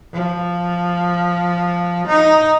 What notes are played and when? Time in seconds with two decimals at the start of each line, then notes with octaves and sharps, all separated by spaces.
0.13 F3
2.07 D#4